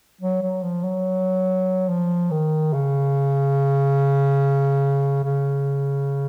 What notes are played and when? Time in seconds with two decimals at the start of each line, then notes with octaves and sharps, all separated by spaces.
0.21 F#3
0.42 F#3
0.63 F3
0.84 F#3
1.89 F3
2.31 D#3
2.73 C#3
5.24 C#3